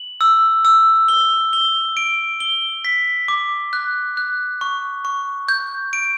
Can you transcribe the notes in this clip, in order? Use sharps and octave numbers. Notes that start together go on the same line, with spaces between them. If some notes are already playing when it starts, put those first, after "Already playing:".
Already playing: F#7
E6
E6
G7
G7
D7
G7
B6
D6
F#6
F#6
C#6
C#6
G6
D7